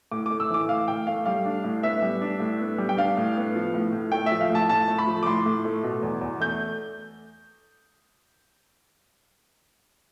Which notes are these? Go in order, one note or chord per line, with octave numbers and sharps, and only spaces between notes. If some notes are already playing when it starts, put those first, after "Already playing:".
A2 D6
A3 D6
E6
E3 D6
A2 F5
A2 G5
A3 F5
G3 F5
D4
A2
B3 E5
G3
D4
A2
B3
G3
G5
D4 F5
A2
B3
F3
A2
A2
A3 G5
E5
F3
F5
A2 A5
A2 A5
A3
B5
F3
D6
A2 C6
A2
A3
B2
E2
E2
A3 G6